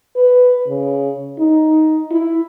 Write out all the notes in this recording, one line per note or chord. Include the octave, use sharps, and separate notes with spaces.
B4
C#3
D#4
E4